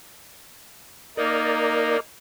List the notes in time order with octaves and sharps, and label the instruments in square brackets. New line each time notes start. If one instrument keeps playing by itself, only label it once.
[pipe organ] A#3 D#4 [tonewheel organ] A#4 D5